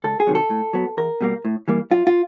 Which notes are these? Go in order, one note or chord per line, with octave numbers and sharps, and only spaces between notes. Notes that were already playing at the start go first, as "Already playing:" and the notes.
C#2 A4
G#4
C3 D#3 F#3
A4
A2
F#3 B3
E2 A#4
B2 G3 A#3
A2
E3 G3 A#3
F#2 F4
F4